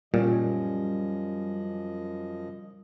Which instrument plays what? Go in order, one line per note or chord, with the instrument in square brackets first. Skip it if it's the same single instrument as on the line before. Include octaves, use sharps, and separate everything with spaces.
[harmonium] F#2 F3 D#5 [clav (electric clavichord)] A#2 [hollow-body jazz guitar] G3 C#4